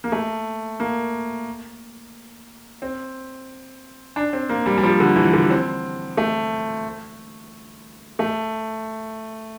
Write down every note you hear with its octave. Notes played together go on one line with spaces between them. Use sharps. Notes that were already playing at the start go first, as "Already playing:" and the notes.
A#3
A3
A#3
C4
D4
C4
A#3
G3
G3
F3
D3
E3
D3
C4
A3
A3